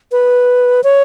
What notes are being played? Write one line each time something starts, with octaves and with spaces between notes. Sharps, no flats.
B4
C#5